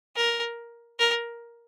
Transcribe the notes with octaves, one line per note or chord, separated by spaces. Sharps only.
A#4
A#4